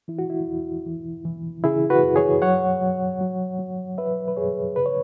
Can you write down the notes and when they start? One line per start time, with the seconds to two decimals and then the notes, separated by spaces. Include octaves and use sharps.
0.08 E3 E4
0.19 F#4
0.30 E4
0.47 E2
0.86 E3
1.25 E3
1.64 C#3 E4 G#4
1.90 F#4 B4
2.03 F#2
2.16 G#4 C#5
2.42 F#3 C#5 F#5
2.81 F#3
3.21 F#3
3.59 F#3
3.98 F#3 B4 E5
4.28 B4
4.36 F#2 G#4 C#5
4.76 C#3 B4
4.86 C#5